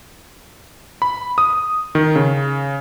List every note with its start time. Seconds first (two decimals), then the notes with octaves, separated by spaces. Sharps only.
1.02 B5
1.38 D#6
1.95 D#3
2.16 C#3